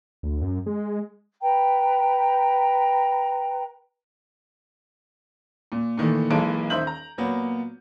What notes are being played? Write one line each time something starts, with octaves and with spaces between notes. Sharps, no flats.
D2
F#2
G#3
B4 G5 A#5
A#2
A#2 D#3 E3 A3
B1 E3 G#3 A#3 A5 D7
D#1 D#4 C5 E5 G6 F#7
A#5
A#2 F#3 A#3 B3